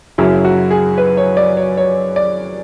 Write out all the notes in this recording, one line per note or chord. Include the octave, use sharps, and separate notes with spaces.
F#2 C#3 F#3 E4
F#4
G#4
B4
C#5
D5
C#5
C#5
D5